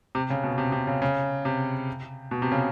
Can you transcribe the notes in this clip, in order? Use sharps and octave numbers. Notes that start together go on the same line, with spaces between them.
C3
C#3
B2
C3
C3
C#3
C#3
C3
B2
C3
C#3